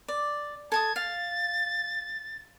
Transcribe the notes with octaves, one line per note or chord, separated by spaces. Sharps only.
D5
A4 A5 D#6 G#6
F5 A6